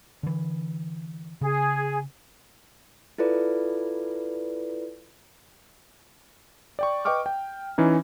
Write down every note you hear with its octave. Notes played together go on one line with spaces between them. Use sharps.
D3 E3
C#3 G#4
E4 F4 A4 B4 D5
D5 G5 C#6
B4 D#5 G5 C#6 D6 F6
G5
E3 C#4 D#4